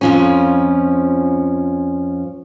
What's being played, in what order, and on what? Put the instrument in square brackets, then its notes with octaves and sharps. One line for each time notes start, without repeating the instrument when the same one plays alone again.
[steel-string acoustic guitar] F2 F3 C#4